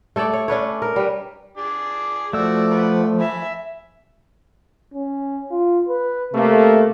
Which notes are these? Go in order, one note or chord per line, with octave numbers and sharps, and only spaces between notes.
A3 A4 C#5 D5
C#5
C#4 D4 B4 C#5
A#4
G3 B4
D4 G#4 D6
F3 A3 F#4 D5 E6
B4 F#5
E5 G#5 B5
C#4
F4
B4
C3 A3 A#3